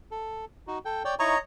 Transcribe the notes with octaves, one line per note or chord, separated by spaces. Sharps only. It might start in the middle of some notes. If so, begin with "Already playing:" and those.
A4
D#4 F#4
A4 G5
C#5 D5 G5
D#4 E4 C#5 D#5 A#5 C#6